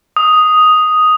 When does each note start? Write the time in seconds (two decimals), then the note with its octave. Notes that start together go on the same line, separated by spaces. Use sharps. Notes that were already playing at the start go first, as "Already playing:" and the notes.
0.16 D#6